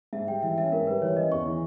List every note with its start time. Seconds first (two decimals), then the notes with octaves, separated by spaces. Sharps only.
0.13 G#2 E5
0.27 G3 G5
0.43 E3 E5
0.57 C#4 E5
0.72 G#2 A#4
0.87 G3 B4
1.01 E3 C#5
1.17 C#4 D#5
1.32 E2 C#6
1.46 E3